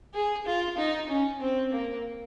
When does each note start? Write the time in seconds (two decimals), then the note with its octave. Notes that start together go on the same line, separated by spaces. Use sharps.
0.14 G#4
0.46 F4
0.78 D#4
1.09 C#4
1.41 C4
1.73 A#3